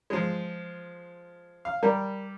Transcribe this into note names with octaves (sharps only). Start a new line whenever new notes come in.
F3 G#3
F5
G3 A#4